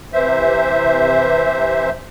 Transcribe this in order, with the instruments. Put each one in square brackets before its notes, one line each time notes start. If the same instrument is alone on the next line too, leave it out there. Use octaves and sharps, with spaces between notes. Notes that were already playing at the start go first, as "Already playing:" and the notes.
[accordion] C3 E3 C5 E5